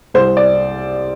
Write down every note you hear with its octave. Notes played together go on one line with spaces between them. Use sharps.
C2 C5
D5